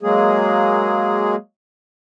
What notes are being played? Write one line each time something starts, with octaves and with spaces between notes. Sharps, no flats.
F#3 G#3 A#3 G#4